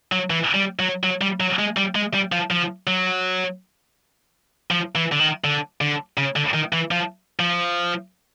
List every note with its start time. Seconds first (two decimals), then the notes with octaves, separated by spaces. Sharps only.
0.12 F#3
0.30 E3
0.55 G3
0.79 F#3
1.04 F#3
1.21 G3
1.40 F#3
1.59 G#3
1.77 G3
1.95 G#3
2.14 G3
2.32 F3
2.51 F3
2.87 F#3
4.71 F3
4.95 E3
5.12 D3
5.20 D#3
5.44 D3
5.81 D3
6.18 C#3
6.36 D3
6.54 D#3
6.73 E3
6.91 F3
7.40 F3